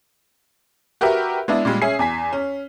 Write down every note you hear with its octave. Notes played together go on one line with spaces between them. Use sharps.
F#4 G4 A#4 B4 E5
G#3 B3 D4 E4
A#2 G3 G#3
C#4 G#4 E5 C7
E2 G#5 B6
C#4